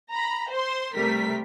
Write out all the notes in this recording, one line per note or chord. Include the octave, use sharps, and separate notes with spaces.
A#5 B5
C5 C6
C3 G3 A3 A#4 B6